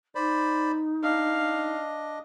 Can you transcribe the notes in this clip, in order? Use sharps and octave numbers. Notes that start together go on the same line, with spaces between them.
D#4 C5 D5 B5
D4 D#5 F5